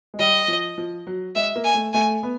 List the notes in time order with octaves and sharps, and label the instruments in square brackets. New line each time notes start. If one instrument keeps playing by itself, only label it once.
[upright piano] G#3
[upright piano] G3 [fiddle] D#5
[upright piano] F3
F3
F#3
[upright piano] G#3 [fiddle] E5
[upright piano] A#3
[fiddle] G#5
[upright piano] A3
[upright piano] A3 [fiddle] G#5
[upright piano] B3